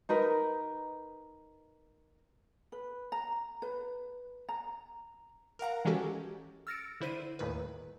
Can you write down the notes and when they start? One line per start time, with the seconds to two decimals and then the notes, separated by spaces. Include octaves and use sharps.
0.09 D#4 A#4 B4
2.72 B4
3.12 A#5
3.62 B4
4.49 A#5
5.59 A#4 F5 F#5 A#5
5.85 E3 G#3 C#4 F#4 G4 A4
6.67 E6 F6 A6 A#6 C#7 D7
7.00 D3 E4 C5 D#7
7.39 G1 D#2 A2 D#3 B4